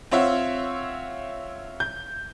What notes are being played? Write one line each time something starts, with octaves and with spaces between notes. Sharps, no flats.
C4 F4 C#5 E5 F#5
G6